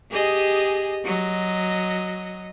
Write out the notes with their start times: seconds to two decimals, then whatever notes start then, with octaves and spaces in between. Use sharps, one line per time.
0.11 G4 G#4 D#5
1.05 F#3 D#5